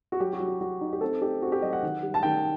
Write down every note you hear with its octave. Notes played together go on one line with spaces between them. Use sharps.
F#4
F#3 G4
F#4
F#3
F#4
F#3 F#4
D#4
G4
C4 A4
D#4 G4
C4 F#4
G4
F#3 D#5
F#5
D#3
G3
A5
D#3 G5